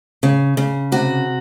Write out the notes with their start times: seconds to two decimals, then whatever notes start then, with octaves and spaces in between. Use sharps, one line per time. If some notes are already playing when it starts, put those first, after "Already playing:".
0.23 C#3
0.57 C#3
0.92 C3 F#4